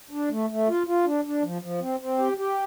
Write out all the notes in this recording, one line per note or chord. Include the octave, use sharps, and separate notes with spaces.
D4
A3
A3
F4
F4
D4
D4
F3
F3
C4
C4
G4
G4